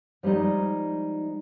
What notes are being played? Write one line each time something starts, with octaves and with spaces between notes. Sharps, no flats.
F3 G3 G#3 D#4 D5